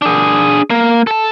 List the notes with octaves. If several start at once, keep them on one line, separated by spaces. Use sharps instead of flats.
D4 G#4
A#3
A4 A5